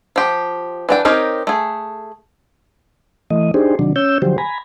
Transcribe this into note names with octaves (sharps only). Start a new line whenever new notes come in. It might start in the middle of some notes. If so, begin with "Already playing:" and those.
F3 G4
E3 D4 G5
C4 D#4 G4 A#4 C#5
A3 G#4
E3 A3 D#5
D4 D#4 G4 G#4 C5
C3 D#3 F#3 D4
C#4 C#5 E6 G6
D3 F3 F#3 G4 C5
G#5 A#5 B5